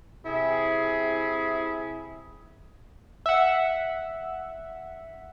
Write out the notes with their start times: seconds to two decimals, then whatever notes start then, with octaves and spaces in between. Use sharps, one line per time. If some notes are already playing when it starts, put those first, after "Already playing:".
0.24 C3 E4 G#4
3.26 E5 F#5